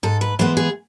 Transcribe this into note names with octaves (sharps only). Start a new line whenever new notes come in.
G#2 A4
B4
E3 G#3 B3 C5
G#4